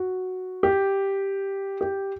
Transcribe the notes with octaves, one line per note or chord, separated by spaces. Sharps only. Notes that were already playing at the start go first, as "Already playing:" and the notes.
Already playing: F#4
G4
G4